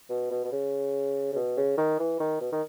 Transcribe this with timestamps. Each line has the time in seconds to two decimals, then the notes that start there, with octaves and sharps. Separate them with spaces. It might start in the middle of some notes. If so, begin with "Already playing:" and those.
0.10 B2
0.31 B2
0.44 B2
0.52 C#3
1.32 C#3
1.35 B2
1.57 C#3
1.77 D#3
1.99 E3
2.20 D#3
2.41 B2
2.52 D#3